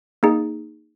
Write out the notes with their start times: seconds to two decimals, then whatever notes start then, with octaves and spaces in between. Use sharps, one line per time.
0.23 A#3 D#4 G#4